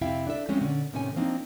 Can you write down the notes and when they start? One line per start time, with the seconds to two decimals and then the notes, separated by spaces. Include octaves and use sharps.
0.01 F2 C3 E4 E5 F5 G5
0.27 D4 A4 E5
0.49 F3 G#3 A3 C4 C#4
0.61 A#2 D3 C#4
0.93 A2 C3 D#3 C#4 G5 G#5
1.16 F3 A#3 C4 D4 D#4